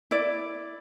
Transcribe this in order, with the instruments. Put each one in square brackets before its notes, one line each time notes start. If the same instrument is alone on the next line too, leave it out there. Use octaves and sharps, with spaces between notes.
[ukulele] E4 D5